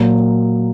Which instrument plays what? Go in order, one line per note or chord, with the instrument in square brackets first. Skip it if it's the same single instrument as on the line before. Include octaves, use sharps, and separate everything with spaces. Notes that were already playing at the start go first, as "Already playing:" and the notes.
Already playing: [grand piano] A#2 F#3 A#3